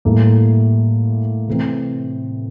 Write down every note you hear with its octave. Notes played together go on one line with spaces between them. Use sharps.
A2 G3 A#3 E4 A4
C3 E3 A3 C4